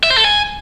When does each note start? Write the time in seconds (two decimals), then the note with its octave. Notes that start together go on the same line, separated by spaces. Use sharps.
0.03 E5
0.10 C5
0.17 A4
0.24 G#5